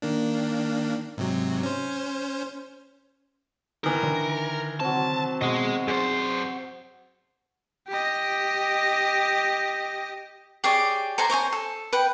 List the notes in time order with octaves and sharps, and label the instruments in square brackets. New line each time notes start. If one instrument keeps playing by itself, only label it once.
[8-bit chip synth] D#3 A#3 D4
G#2 C3 F#3
C#4 C5
[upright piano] D#3 E3 [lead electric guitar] A#4
[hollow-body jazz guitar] D3
[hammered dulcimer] C3 F#3 [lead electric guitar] A5
[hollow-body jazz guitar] B2 [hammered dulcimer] F#4 [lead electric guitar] G#4 D#5
[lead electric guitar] F#2 C5 [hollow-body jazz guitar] G#4 D5
[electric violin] G4 D#5
[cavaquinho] G4 G#4 C#5 D5
A4 C5 G#5 A#5
C5 C#5 D#5 G#5
A4
B4 F#5 G5